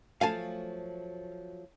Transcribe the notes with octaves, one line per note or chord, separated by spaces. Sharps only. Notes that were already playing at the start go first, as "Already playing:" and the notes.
F3 F#3 A3 F5 G#5 A5